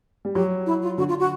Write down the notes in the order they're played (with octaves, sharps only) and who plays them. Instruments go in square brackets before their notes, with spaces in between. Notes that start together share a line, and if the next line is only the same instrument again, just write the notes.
[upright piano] G3
[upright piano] F#3 [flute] G4
[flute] E4
F4
[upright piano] D3 [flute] F#4
[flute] F4
F#4